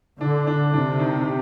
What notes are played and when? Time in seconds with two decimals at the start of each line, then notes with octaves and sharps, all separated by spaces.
0.20 D3 D4
0.47 D4
0.73 C3 D4
0.99 D#3
1.26 G4